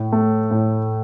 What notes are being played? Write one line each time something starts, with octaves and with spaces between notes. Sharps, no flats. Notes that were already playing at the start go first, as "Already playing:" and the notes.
Already playing: A2
A3
A2